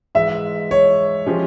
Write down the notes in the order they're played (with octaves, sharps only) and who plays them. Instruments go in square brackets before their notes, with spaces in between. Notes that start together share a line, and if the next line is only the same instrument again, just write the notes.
[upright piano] G#2 E3 G#3 [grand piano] E5
[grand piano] C#5
[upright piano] F3 G#3 C#4 G4